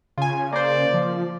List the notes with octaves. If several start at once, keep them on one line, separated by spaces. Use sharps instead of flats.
C#3 F4 G#5
A#3 C5 D5
F3